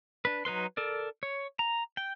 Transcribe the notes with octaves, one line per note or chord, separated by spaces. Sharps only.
D4 B4
F#3 D#4 B4 C6
A4 A#4 D5
C#5
A#5
G5